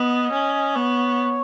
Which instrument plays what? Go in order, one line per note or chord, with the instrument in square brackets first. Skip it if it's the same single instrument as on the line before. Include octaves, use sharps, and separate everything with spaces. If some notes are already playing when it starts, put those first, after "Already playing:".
Already playing: [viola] B3 [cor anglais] D#5
[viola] C#4
[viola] B3 [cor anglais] C#5